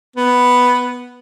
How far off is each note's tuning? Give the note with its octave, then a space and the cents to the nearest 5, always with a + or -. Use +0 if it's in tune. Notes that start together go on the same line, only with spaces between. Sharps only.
B3 +0